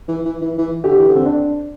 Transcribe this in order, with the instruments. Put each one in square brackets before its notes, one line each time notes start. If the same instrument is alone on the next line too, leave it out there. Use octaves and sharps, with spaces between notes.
[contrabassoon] E3
E3
E3
E3
[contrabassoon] D3 [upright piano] G4
[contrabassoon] E3
D3
[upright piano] C4
D4